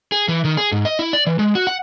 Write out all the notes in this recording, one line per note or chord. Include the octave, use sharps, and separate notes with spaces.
G#4
E3
D#3
G#4
G#2
D#5
E4
D5
E3
G#3
F#4
F#5